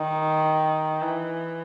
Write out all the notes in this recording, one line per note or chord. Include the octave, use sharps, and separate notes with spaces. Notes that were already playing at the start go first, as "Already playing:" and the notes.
Already playing: D#3
E3